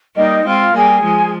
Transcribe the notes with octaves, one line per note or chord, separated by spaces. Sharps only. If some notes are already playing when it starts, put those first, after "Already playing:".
G3 A#3 D#4 D#5
G#3 C4 F4 F5
G3 A#3 G#4 G#5
F3 G#3